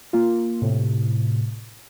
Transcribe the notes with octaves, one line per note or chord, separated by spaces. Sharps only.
A#3 F4
A2 C3